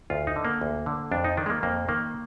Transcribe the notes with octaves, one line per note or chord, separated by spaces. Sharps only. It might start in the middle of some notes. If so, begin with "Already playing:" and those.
D2 F4
D#4
D3
A#3
D2
D3
F2 D4
D#4
D#3 D4
G#3
A#3
F2 A#3
D#3 A#3